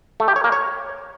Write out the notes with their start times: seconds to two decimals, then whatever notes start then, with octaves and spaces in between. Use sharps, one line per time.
0.20 A3
0.28 G4
0.36 C#5
0.44 A#3
0.52 C#5